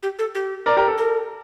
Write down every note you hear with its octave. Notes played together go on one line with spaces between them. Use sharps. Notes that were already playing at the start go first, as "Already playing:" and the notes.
G4
A4
G4
A#4 D5
G4 A#4
A4
A#4